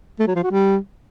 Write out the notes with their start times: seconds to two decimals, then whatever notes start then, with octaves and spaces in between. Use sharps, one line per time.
0.19 A3
0.27 F#3
0.35 F3
0.43 F#4
0.51 G3